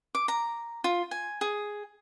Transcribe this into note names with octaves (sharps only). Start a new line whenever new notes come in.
D6
A#5
F4
G#5
G#4